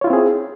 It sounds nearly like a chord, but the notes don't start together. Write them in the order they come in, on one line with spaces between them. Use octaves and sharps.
C#5 F4 E4 C4 G#4